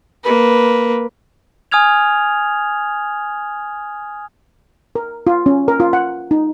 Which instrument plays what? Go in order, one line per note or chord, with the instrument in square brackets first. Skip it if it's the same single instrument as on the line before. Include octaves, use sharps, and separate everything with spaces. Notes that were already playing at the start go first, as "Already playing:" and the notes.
[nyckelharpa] A#3 B4
[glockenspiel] G#5 D#6 F6 G#6 F7
[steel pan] A#4
F4
C#4
A#4
F4
F#5
D#4